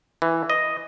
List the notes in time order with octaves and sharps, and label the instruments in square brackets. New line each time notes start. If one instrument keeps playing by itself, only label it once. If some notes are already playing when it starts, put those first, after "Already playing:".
[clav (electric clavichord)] E3
D#5